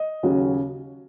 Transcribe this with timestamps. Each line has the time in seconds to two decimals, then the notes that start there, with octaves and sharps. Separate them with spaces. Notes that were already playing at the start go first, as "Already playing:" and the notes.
Already playing: D#5
0.23 D#2 C#3 F#3